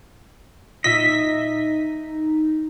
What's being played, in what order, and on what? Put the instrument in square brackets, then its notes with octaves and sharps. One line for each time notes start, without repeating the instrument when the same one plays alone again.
[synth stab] A#2 B6 [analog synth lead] D#4 [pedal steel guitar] D#5 E5